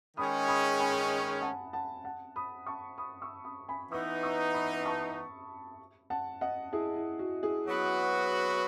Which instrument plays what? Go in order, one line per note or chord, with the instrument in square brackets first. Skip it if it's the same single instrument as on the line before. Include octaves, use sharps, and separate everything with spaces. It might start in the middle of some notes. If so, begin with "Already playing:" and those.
[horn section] D#3 G#3 C#4 G#4 [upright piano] B5 D#6
[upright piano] B5 D#6
G#5 B5
F#5 A5
F#5 A5
F#5 A5
B5 D#6
A5 C#6
B5 D#6
C#6 E6
B5 D#6
G#5 B5
[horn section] E3 B3 D#4 [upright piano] C#6 E6
[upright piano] C#6 E6
B5 D#6
A5 C#6
F#5 A5
D#5 F#5
E4 G#4
E4
F#4
E4 G#4
[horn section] F#3 B3 F#4 B4